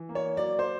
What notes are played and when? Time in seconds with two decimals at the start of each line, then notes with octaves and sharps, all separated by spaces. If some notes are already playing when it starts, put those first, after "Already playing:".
Already playing: E3
0.09 A#3
0.15 C#5
0.37 F#3 D5
0.59 C5